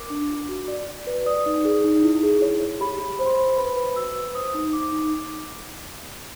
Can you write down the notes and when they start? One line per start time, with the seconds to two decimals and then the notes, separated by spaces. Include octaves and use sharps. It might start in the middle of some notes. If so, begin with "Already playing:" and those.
Already playing: A#4 D6
0.10 D4
0.30 F4
0.49 F#4
0.68 D5
0.87 D5
1.07 B4
1.26 D5 D#6
1.46 D#4
1.65 G#4
1.84 D#4
2.03 E4
2.23 G#4
2.42 C#5
2.61 C#5
2.80 G4 B5
2.99 G4
3.19 C5 B5
3.26 C6
3.34 C5 B5
3.57 B4 B5
3.76 B4
3.96 F#4 E6
4.16 B4
4.35 C5 D#6
4.54 D#4
4.73 D#4 D6
4.92 D#4